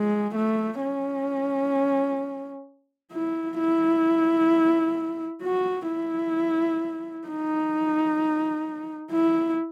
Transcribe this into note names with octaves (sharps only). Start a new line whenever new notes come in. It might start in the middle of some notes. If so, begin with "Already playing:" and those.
Already playing: G#3
A3
C#4
E4
E4
F#4
E4
D#4
E4